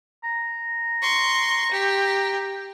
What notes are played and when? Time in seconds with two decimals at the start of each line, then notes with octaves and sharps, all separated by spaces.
0.24 A#5
1.02 C6 C#6
1.71 G4